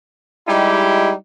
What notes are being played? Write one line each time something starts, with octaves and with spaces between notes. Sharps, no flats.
G3 G#3 D#4 E4 G4